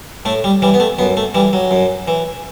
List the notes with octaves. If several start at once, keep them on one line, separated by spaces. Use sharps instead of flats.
A2 A3
G3
E3 G3
B3
A3
F#2 B3
A3
E3 G3
F#3
F#2
E3